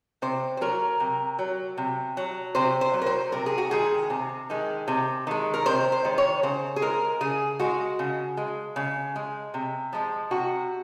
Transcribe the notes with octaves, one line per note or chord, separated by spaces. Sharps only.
C3 C5
C5
F#3 A#4
C3
F#3
C3
F#3
C3 C5
C5
F#3
A#4
C5
C3 A#4
G#4
F#4
D#3 G#3 G#4
C3
D#3 G#3
C3
D#3 G#3
A#4
C3 C5
C5
D#3 G#3
C#5
C#3 C5
G#4
G#3 A#4
C#3 G#4
G#3 F#4
C#3
G#3
C#3
G#3
C3
F3 G#3
C3 F#4